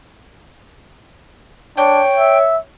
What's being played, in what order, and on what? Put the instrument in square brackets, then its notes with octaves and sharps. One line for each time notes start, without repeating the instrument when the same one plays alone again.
[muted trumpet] D4 [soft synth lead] C#5 [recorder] G5
[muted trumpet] E5